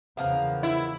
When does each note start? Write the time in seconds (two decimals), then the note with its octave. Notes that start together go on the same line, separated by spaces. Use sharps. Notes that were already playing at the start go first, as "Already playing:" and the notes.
0.17 E2 C#3 F3 A#3 B3
0.63 E4